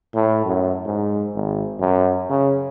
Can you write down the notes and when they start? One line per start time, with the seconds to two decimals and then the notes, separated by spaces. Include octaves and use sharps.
0.14 A2
0.45 F#2
0.85 G#2
1.34 G#1
1.80 F#2
2.30 C#3